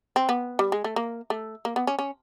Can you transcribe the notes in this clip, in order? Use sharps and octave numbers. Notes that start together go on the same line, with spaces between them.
C4
B3
G3
G#3
A3
A#3
A3
A#3
B3
C#4
C#4